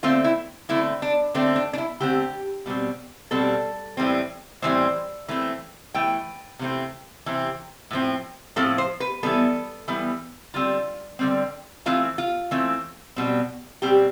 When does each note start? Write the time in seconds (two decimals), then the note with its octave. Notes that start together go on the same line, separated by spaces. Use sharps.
0.03 D3 A3 C4 F4
0.24 E4
0.69 D3 A3 C4 E4
1.02 D4
1.34 D3 A3 C4 D4
1.56 D4
1.73 D4
1.78 E4
2.00 D3 A3 C4 G4
2.66 B2 G3 C4
3.31 B2 G3 C4 A4
3.97 A2 E3 G3 C4
4.62 A2 E3 G3 C4 C5
5.28 E3 A3 C4
5.94 E3 A3 G5
6.59 C3 E3 A3 C4
7.26 C3 E3 C4
7.91 A2 F3 C4
8.56 A2 F3 C4 A4
8.78 C5
9.00 B4
9.23 E3 G3 B3 A4
9.88 E3 G3 B3
10.54 D3 G3 C4 F4
11.19 D3 G3 C4
11.86 E3 A3 C4 F4
12.18 F4
12.51 E3 A3 C4
13.16 B2 G3 C4
13.82 B2 G3 C4 G4